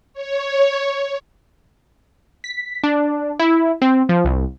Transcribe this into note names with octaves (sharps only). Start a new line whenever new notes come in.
C#5
B6
D4
E4
C4
F3
C2